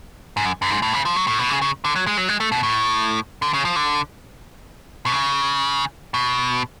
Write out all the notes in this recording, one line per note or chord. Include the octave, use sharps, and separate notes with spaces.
G#2
F#2
F#2
G#2
A2
C#3
F3
F#3
A2
B2
C#3
C#3
D3
F#3
G#3
F#3
G#3
A3
B2
A2
D3
C#3
F3
D3
B2
C#3
B2